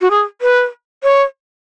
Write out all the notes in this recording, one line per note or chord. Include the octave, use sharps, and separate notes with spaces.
F#4
G#4
B4
C#5